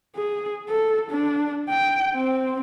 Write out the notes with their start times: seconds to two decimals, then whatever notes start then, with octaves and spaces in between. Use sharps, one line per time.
0.16 G#4
0.69 A4
1.11 D4
1.69 G5
2.15 C4